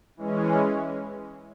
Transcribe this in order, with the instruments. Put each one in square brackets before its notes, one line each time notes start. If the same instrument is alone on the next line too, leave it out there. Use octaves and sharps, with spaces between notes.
[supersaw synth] E3 G#3 C#4